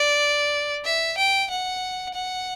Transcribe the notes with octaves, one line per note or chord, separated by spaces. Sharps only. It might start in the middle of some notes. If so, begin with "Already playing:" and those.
Already playing: D5
E5
G5
F#5
F#5